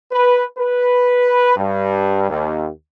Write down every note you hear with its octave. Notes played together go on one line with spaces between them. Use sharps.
B4
B4
G2
D#2